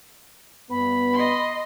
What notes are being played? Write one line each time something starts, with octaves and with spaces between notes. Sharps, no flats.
G2 B3 B5
D#5 C6